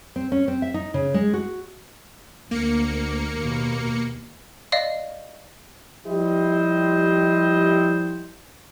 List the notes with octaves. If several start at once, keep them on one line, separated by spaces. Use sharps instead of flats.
C4
C#4
C4
E5
D#4
C#3
G#3
F#4
D2 A#3 C#7
D#2 B2
D5 D#5 F5
F3 G3 E4 G4 C5 D#5